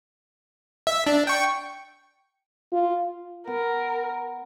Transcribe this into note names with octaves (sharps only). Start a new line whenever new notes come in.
E5
D4
G5 C#6
F4
B3 A#4